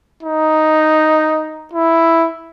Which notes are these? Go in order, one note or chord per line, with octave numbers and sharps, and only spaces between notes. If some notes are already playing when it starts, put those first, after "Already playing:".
D#4
E4